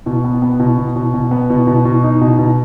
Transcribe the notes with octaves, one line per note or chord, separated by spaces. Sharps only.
B2
B3
B3
B2
B2
B2
B2
B3
B2
B2
B2
D#4
B2
B2